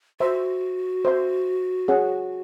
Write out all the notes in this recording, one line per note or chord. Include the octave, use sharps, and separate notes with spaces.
F#4 C5 E5 C6
C5 E5 C6
C#4 G#4 C#5 F#5